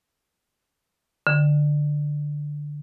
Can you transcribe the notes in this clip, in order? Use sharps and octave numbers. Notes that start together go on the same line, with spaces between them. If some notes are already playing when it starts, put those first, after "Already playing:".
D3